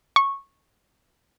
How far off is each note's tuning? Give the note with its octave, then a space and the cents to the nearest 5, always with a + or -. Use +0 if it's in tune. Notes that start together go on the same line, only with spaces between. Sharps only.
C#6 -10